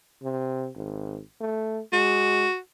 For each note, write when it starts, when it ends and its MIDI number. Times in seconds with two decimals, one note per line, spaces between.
0.23 0.69 48
0.75 1.20 32
1.41 1.82 57
1.93 2.46 56
1.93 2.58 66